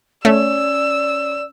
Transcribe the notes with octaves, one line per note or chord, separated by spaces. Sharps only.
A3 C#4 C#5 D5 E6